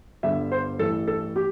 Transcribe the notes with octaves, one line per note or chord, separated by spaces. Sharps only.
G1 G2 D3 E5
C5
A1 G2 E3 A4
A4
G4